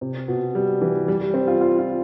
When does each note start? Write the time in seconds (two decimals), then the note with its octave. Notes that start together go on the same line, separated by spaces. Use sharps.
0.01 C3
0.28 B2
0.55 G3
0.81 E3
1.08 G3
1.21 G3
1.34 C4
1.48 F4
1.61 F4
1.79 F4